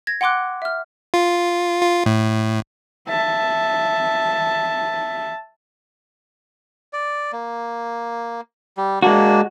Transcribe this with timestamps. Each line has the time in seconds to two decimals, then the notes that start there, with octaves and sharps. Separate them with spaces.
0.07 G#6 A#6
0.21 F#5 G5 C6 D6 F#6
0.62 E5 F6
1.14 F4
1.82 F4
2.06 A2
3.09 E5 A5
6.93 D5
7.33 A#3
8.77 G3
9.02 G#3 A#3 D4 F#4